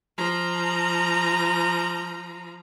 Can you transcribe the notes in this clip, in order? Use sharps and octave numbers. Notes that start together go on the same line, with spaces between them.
F3 A#5